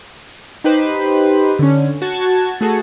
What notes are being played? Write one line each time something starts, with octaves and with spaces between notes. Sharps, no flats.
D#4 G4 B4 C5
D3 C#4
F#4 A5 G#6
A3 F#4 G#4 A4